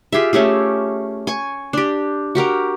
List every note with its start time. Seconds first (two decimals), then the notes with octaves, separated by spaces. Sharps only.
0.12 F4 G4 G#4 E5
0.33 A3 C#4 G4 G#4
1.27 G#5 C#6
1.73 D4 G4
2.35 F#4 G4 A#4 F5